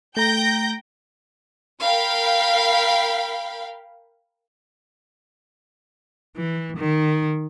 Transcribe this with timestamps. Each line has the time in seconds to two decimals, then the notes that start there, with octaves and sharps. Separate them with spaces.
0.17 A3 G5 A#5 G6 A#6
1.80 A#4 F5 G5 B5
6.37 E3
6.77 D#3